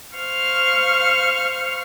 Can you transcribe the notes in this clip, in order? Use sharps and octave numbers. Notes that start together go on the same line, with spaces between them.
C5 F5 C#6 F6